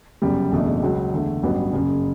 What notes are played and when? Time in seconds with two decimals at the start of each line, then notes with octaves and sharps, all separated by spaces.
0.22 G1 F#2 C#3 G3
0.52 F#1 E2 B2 A3 D4
0.82 C#2 C#3 F#3
1.13 E2 D3 A3
1.43 A1 G2 F#3 B3
1.73 F#1 F#2 C#3